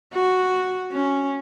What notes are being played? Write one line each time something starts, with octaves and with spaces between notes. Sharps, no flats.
F#4
C#4